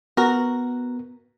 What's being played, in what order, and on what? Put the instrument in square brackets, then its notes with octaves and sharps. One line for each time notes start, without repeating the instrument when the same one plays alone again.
[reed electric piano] B3 [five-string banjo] F#4 A#4